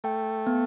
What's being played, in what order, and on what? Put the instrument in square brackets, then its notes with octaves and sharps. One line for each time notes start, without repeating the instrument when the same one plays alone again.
[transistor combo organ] A3 [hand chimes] G5
[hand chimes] B3